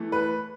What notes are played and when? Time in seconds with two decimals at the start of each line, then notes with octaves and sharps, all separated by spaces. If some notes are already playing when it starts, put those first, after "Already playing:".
Already playing: E3 A3
0.12 B4